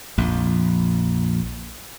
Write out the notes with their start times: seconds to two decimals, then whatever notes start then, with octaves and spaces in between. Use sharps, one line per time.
0.18 A#1 F2